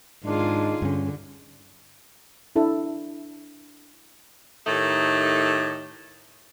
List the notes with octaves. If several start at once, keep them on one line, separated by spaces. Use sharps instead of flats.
G#2 D#3 D4 D#4 F4 G#4
G2 D3 C#4
D4 E4 A4
A2 D#3 A3 D#4 G4 A4